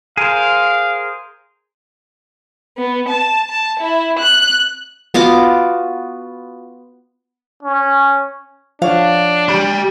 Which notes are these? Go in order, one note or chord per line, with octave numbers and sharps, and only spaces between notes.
G#4 A#4 C5 F5
B3
A5
A5
E4
F#6
B3 F4 F#4 D6
C#4
F3 D4 C#5 F5 F#5
G4 B5